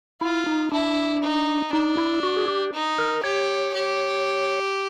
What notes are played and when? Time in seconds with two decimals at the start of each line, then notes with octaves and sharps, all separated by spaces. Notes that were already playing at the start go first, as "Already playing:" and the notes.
0.21 E4 F4
0.46 D#4
0.71 D4 E4
1.23 D#4
1.73 D4 D#4
1.97 E4
2.23 F#4
2.36 G#4
2.48 G4
2.74 D#4
2.99 A#4
3.23 G4 C#5
3.74 G4